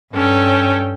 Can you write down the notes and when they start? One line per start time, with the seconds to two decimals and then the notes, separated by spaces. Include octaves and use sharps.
0.12 G2 C#4 A4 G5